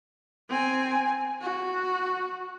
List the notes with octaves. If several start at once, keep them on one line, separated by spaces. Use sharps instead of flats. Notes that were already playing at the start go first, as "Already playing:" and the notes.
C4 G#5
F#4